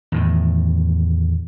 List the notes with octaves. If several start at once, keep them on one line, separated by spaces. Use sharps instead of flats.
E2 A2 D#3